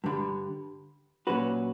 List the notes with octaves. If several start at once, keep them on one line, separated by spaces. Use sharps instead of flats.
G2 D3 G3
A#2 F#3 C#4 F#4 B4